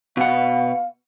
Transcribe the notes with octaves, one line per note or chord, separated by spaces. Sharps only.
B2 F5 F#5